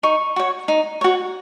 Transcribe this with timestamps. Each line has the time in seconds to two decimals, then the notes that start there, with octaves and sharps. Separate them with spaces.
0.03 D#4 C#6
0.36 F#4 C#5
0.68 D#4
1.01 F#4 C#5